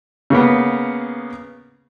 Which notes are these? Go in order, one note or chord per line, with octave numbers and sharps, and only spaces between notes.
C#3 A#3 B3